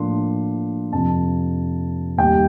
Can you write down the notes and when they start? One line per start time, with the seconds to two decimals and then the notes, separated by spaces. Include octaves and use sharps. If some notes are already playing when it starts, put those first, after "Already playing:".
Already playing: A2 F3 A#3 D4 C6
0.92 F2 C3 F3 A5
2.18 D#2 D#3 G3 G5